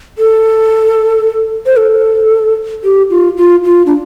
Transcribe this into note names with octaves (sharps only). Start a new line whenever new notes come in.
A4
C5
A4
G4
F4
F4
F4
D4